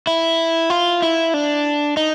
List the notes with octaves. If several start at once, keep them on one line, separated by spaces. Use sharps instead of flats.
E4
F4
E4
D4
D#4